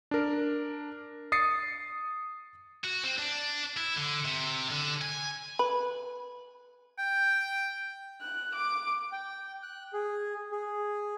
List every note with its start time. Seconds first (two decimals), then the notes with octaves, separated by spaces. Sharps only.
0.11 D4 A#4
1.32 D#6 A6 C7 C#7
2.85 F#4
3.04 C4
3.19 D4
3.78 E4
3.97 D3
4.25 C3
4.71 D3
5.02 G#5
5.59 B4
6.98 G5
8.21 F#6
8.56 D6
9.12 G5
9.63 F#6
9.93 G#4
10.52 G#4